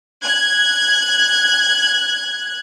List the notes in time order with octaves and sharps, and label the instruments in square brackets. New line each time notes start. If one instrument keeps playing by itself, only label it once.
[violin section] F#6 G#6